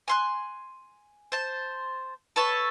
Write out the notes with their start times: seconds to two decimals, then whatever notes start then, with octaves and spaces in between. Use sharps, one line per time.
0.08 G#5 C6 F#6
1.32 C5 A5
2.36 A4 B4 C#5 A5